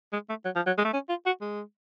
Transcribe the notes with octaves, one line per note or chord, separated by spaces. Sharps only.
G#3
A3
F#3
F3
F#3
G#3
A3
C#4
F4
F#4
G#3